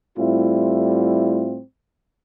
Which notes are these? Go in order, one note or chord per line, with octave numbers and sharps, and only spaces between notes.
A2 G3 A3 C4 E4 F4